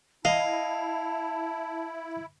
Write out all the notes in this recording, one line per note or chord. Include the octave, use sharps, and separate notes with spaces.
E4 D#5 F5 A5